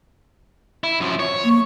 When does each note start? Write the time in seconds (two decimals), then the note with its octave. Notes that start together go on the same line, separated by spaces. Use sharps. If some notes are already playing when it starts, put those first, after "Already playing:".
0.84 E4
1.00 F#2 F3
1.19 C#5
1.44 A#3